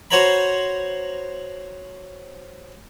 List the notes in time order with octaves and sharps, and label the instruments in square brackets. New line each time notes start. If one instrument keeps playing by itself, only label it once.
[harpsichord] F#4 C5 C#5 A#5 B5